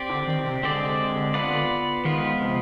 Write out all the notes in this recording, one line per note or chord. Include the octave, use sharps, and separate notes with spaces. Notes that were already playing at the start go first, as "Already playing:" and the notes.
Already playing: C4 G4 D5
D3
D#3
C3
D3 G#3 C4 G4 D5
B3 F4 B4 D5
D#3 F3 G#3 B3 F4 B4
C3